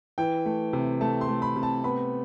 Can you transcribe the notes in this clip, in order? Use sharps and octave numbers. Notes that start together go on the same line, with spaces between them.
E3 G5
A3
C3
A3 A5
C6
A3
B5
C3
A5
B3 B5